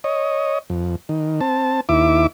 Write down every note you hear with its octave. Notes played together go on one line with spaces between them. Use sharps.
C#5 D#5
F2
D#3
C4 A5
D#2 E4 E5 D6